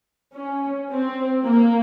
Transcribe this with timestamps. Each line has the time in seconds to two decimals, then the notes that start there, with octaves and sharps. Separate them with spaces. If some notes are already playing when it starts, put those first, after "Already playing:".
0.35 C#4
0.90 C4
1.46 A#3